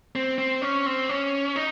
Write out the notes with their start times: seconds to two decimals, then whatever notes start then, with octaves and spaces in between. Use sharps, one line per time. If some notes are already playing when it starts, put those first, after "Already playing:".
0.15 C4
0.38 C4
0.62 C#4
0.86 C4
1.09 C#4
1.56 D#4